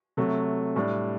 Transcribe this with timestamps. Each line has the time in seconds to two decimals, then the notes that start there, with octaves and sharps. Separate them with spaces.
0.17 C3 F#3 A3
0.76 A2 G3 D4